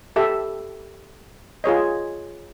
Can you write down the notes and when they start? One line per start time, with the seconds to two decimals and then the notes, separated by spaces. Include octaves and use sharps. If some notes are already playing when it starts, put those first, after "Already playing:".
0.16 G4 A4 E5
1.64 F4 G#4 C#5 D#5